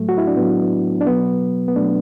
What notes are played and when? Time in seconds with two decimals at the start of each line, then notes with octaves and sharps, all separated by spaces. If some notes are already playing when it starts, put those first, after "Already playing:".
Already playing: A2 F#3 A3
0.09 F#4
0.18 E4
0.27 D4
0.36 A2 F#3 B3
1.01 D4
1.07 B2 F#3 B3
1.68 B3
1.76 B2 A3 D4
1.81 F#3